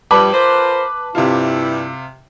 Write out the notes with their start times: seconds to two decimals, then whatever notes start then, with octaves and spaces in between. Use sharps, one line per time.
0.11 G2 F3 G3 B4 A5 D6
0.32 F4 A#4 C5
1.15 G2 C3 E4 F4